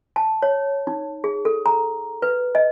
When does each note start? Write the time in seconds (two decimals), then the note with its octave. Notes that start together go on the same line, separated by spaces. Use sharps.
0.16 A5
0.42 C#5
0.87 D#4
1.24 G#4
1.45 A4
1.66 A#5
2.22 B4
2.55 D#5